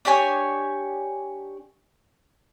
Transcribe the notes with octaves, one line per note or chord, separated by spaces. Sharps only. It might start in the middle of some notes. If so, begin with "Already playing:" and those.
D4 G4 C#5 G#5